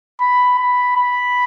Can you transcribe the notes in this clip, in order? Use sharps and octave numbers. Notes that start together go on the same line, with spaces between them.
B5
B5
B5